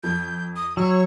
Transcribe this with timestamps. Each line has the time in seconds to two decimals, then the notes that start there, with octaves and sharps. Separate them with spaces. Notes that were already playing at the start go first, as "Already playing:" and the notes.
0.04 F2 G6
0.56 D#6
0.77 F#3 C#5 E6